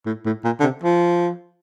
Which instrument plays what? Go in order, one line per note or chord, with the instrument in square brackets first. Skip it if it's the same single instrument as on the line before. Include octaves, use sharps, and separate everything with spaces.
[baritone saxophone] A2
A2
A#2
D3
C3
F3